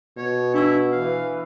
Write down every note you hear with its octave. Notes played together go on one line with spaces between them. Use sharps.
B2 C#5
D4 E4 C#6 E6
E3 F5